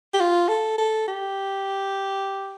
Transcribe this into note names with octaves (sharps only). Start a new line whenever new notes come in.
G4
F4
A4
A4
G4